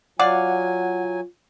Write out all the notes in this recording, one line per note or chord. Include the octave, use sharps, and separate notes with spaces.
F#3 F4 D5 F5 F#5 G#5